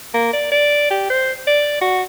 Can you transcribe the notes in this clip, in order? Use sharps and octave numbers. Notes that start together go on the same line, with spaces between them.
A#3
D5
D5
G4
C5
D5
F#4